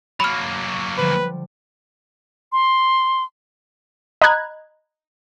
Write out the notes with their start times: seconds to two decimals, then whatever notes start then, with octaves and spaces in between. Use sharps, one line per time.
0.20 F#3 A#3 B5 F6
0.98 D3 F3 G3 B4
2.52 C6
4.22 D#5 A#5 B5 F#6 G#6